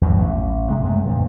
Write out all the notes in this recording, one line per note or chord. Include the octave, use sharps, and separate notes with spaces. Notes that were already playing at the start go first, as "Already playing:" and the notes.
E2 G2 B2 F#3
A1
C3 G#3
F#2 G#3 A3
F2 A#2 D3 E3